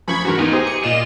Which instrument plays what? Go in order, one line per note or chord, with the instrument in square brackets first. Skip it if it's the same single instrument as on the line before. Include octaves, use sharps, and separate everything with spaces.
[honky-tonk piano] F#2 F3 [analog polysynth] B5 C#6 G#6
[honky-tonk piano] E2 G#2 [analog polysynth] F#4 A#4
[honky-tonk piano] B3 [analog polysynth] D#4 [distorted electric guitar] F4 G#4
[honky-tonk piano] G4 C5 D#6 [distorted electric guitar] G#4
[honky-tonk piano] D6 [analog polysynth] C#7
[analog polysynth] A#2 D#5 E7 [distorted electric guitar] F4